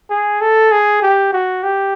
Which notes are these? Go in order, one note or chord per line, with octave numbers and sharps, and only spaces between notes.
G#4
A4
G#4
G4
F#4
G4